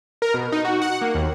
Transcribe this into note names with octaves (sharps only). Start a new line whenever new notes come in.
A#4
B2
D#4
F#4
F#5
A#3
D#2